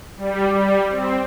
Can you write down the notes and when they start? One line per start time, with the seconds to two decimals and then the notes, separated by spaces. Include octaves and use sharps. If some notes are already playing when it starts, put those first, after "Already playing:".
0.17 G3
0.54 G3
0.90 C4